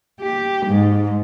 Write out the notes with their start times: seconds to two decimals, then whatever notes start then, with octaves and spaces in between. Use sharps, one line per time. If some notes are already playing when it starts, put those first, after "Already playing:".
0.20 G4
0.66 G#2